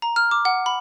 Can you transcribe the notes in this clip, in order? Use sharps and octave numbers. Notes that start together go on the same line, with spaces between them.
A#5
F6
D6
F#5
B5